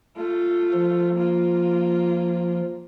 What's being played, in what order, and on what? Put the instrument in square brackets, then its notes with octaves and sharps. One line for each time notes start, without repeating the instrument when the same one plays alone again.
[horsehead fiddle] A3 F4
[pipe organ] F3
[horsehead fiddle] A#3 F4